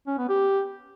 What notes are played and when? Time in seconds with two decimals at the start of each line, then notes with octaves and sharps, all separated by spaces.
0.07 C#4
0.18 B3
0.29 G4